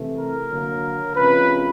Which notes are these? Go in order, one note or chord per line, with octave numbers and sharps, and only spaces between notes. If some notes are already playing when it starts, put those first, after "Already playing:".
Already playing: C3 E3 A3
A#4
D3 F#3 A#3
C3 E3 G#3 C#4 F4 B4